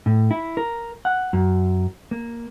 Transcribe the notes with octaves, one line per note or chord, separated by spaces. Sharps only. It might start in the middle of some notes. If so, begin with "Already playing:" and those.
A2
E4
A#4
F#5
F#2
A#3